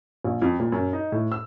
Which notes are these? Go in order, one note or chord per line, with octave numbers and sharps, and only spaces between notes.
A#1
F2
A#2
F#2
D#4
A2
E6